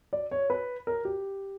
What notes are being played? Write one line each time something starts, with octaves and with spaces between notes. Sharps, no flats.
D5
C#5
B4
A#4
G4